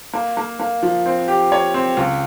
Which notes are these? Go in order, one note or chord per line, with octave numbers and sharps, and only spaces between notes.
A#3
A#3
A#3
F3
C4
G4
C#5
C4
C#2